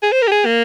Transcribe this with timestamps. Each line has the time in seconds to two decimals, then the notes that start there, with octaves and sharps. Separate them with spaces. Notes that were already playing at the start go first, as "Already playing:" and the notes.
0.03 G#4
0.12 C5
0.22 A#4
0.28 G4
0.32 G#4
0.46 A#3